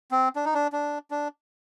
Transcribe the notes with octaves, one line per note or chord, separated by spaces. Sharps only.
C4
D4
D#4
D4
D4
D4